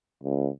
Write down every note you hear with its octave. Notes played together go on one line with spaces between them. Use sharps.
C#2